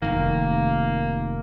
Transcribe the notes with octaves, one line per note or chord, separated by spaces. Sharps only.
F1 A#1 D#3 A#3